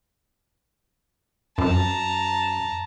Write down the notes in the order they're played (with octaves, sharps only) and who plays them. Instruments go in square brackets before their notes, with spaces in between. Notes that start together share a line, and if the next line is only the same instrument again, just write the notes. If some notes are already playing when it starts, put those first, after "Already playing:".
[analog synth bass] F#2 [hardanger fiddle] A5 A#5